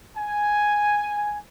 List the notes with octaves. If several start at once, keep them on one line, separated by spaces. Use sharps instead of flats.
G#5